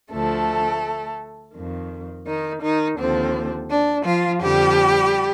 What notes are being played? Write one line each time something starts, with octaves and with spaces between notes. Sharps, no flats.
D2 D3 F3 A3 A4
F2 D#3
D#3 D#4
D#3 D#4
D#2 D3 F3 C4
D4
F3 F4
F2 D3 F3 G3 G4